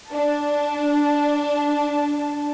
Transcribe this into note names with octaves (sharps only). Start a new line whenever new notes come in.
D4 A5